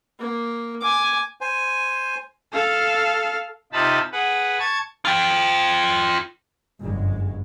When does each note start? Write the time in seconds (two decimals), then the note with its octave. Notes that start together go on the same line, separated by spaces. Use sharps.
0.20 A#3
0.81 G#5 D6
1.41 C5 G#5
2.53 A4 F5
3.73 C3 D#4 F4 A5 B5
4.12 G#4 B4 F#5
4.59 A5 C#6 G#6 A6
5.05 F4 G5
6.82 G1 C2 F#2 G#3